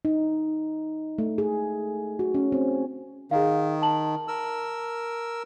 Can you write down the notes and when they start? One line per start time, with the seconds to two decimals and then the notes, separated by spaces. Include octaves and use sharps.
0.05 D#4
1.18 A3
1.38 G#4
2.19 F#4
2.34 C#4
2.52 C4
3.31 D#3 G#4 F5
3.82 A5 F#7
4.28 A#4 E6